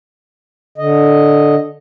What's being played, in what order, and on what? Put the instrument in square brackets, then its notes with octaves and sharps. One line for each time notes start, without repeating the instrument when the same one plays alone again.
[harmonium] D3 D#5